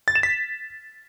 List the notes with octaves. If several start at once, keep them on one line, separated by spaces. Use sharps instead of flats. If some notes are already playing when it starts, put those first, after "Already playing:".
A6
E7
B6